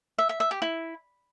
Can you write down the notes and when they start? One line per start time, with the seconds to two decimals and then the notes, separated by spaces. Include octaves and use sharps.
0.18 E5
0.29 E5
0.40 E5
0.51 G4
0.62 E4